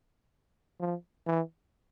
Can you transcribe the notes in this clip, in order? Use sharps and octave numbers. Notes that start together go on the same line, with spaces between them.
F3
E3